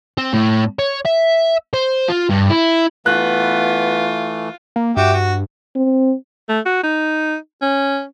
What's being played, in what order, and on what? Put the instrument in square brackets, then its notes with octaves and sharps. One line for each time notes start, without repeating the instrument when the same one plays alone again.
[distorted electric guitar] C4
A2
C#5
E5
C5
F4
G2
E4
[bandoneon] E3 A3 [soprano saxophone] B3 [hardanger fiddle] F4 [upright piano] F#6
[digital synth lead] A#3
[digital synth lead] G2 [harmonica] F#4 G4 E5
[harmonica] F#4
[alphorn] C4
[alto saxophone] A3
F#4
D#4
C#4